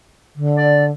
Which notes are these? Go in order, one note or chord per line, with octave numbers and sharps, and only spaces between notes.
D3
D5